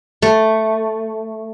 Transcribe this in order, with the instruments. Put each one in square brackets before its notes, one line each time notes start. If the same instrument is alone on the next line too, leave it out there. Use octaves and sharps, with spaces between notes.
[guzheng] A3